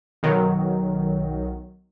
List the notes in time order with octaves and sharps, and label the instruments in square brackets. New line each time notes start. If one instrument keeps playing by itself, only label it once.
[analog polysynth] B1 D#3 F#3